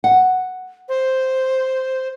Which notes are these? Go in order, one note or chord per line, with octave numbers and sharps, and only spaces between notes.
F#5
C5